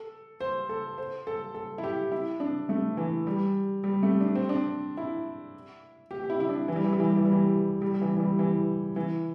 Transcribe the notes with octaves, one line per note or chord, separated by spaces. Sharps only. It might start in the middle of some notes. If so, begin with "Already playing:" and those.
Already playing: A4
C5
A4
C5
A4
A4
E4
G4
E4
D4
A3
E3
G3
G3
A3
D4
C4
D4
E4
G4
G4
E4
E4
D4
E3
G3
E3
G3
E3
G3
E3
G3
E3
G3
G3
E3
E3
G3
E3
E3